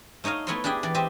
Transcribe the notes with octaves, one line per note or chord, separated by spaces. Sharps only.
A3 D#4 C#5 D#5 F5
A3 B3 E4 C#5 D#5 C6
D4 G4 G#4 E5 G5
E3 D5
G4 C5 D#5 E5